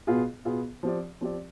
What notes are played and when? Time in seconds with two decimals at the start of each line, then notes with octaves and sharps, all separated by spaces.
0.07 B2 B3 F4 G#4
0.45 B2 B3 F4 G#4
0.83 F3 C4 G4 D5
1.21 F3 C4 G4 D5